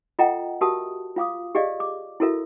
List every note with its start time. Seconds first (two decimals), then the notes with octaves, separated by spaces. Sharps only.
0.19 F4 A4 D#5 F#5 G5 A#5
0.61 F#4 G4 A#4 E5 A5 D#6
1.16 F4 F5 D6 D#6
1.55 G4 G#4 D5 D#5 F5
1.80 D6
2.20 E4 F#4 A4 A#4 E5